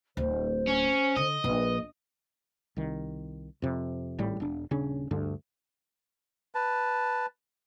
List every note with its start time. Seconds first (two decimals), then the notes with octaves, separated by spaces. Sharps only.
0.17 D1 C5
0.67 C#4
1.17 D3 D#5
1.44 A#1 B4
2.76 C2 D#3
3.62 F2 C3
4.19 G#1 A2 G3
4.40 E1 D4
4.71 D#1 C#3 C#4 D4
5.11 D2 G2 D3 D4
6.55 B4 A5